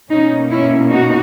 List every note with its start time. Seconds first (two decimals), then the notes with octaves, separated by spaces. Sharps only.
0.10 B2 A#3 C#4 D#4
0.50 C#4 E4
0.91 D#4 F#4